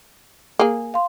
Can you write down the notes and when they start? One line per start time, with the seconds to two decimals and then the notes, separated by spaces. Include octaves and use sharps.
0.59 A#3 G#4
0.94 F5 C6